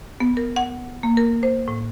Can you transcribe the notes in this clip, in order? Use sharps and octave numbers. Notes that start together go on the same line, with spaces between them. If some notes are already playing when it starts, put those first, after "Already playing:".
B3
A#4
F#5
A#3
A#4
C5
A2